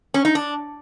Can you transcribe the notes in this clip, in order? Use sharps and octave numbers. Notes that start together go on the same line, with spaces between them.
C#4
D#4
D4